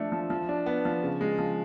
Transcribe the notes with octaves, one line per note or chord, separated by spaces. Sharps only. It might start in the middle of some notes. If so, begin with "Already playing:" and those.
Already playing: F3 A3 D4
F3
F3
D4
B3
F3
C#3
G#3
F3